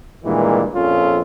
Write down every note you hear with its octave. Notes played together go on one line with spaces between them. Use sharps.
G2 A#2 D#3 E3 G#3
A#1 F2 C#4 F4 A4